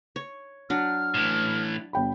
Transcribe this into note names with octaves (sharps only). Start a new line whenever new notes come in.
C#5
F#3 D4 F6
A2 E3
G1 G5 B5